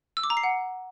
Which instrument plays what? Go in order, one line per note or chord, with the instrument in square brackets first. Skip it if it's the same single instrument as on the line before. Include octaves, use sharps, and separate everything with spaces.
[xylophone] E6
D6
A#5
C7
F#5